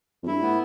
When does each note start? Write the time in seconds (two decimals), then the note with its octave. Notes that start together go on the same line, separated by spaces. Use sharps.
0.23 F2
0.27 G2 E4
0.42 A2 B3